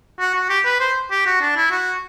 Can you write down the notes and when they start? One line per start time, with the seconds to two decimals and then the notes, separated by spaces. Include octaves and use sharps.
0.20 F#4
0.35 F#4
0.50 G4
0.65 B4
0.80 C5
1.11 G4
1.26 F#4
1.41 D4
1.57 E4
1.71 F#4